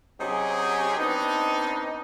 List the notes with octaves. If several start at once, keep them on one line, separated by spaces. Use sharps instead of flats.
C3 F#3 C#4 D#4 G4 G#4
B3 C4 D4 D#4